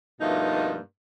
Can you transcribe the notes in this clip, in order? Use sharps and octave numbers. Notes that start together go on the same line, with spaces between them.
G2 B2 F3 A3 A#3 D#4